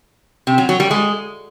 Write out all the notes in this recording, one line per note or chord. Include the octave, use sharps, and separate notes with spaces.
C3
F#3
F#3
G3
G#3